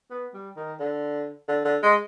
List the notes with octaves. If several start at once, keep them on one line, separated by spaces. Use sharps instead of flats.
B3
G3
D#3
D3
D3
D3
G#3